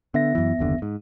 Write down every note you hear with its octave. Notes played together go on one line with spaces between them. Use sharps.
D3 B3 E5 A#6
F#2 E3
F#1 D#2 D3
G#2